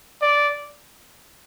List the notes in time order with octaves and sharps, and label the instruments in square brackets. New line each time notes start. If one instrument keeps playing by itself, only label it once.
[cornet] D5